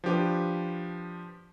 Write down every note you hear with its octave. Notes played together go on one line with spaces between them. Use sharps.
F3 D4 G4 B4